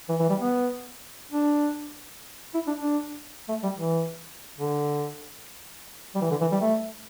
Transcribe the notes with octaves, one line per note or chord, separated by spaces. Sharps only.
E3
E3
G3
B3
D4
E4
D4
D4
A3
G3
E3
D3
G3
E3
D3
E3
G3
A3